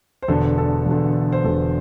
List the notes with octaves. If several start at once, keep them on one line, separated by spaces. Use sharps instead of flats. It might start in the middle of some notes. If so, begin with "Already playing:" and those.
C5
E1 E2 D3 A4
A4
E1 E2 D3
C5
E1 E2 D3 A4